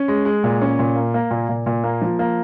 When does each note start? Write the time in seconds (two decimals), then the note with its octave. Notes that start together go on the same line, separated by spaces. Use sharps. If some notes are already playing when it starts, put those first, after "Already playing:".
Already playing: C#4
0.08 G#3
0.25 G#3
0.44 A#2
0.61 C#4
0.79 A#2
0.95 A#3
1.14 A#3
1.31 A#2
1.49 A#2
1.66 A#2
1.84 A#3
2.01 F3
2.19 A#3